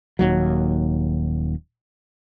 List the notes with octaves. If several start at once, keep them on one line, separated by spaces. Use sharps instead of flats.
D#1 D#2 F#3